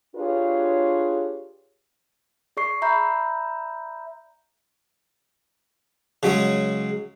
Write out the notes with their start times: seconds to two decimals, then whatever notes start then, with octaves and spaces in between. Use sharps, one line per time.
0.16 D4 F4 G4 G#4 B4 C#5
2.57 G#4 D5 C#6 C7
2.82 D5 E5 A#5 B5 G6
6.23 C#3 F#3 G#3